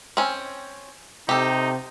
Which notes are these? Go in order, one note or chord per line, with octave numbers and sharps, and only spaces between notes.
C4 C#4
C3 D#4 G4 A4